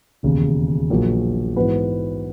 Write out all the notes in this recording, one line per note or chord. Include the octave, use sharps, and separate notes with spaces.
E1 D#2 C#3
A#1 A#2 F#3 A#3
G#2 E3 B3 F#4 B4